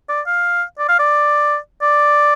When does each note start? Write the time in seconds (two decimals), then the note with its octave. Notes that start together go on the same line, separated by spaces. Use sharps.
0.09 D5
0.27 F5
0.79 D5
0.89 F5
0.99 D5
1.82 D5